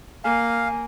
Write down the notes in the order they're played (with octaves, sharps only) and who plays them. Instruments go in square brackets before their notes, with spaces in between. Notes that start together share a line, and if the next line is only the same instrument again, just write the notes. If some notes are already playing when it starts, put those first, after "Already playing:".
[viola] A#3 [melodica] F5 [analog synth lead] G#5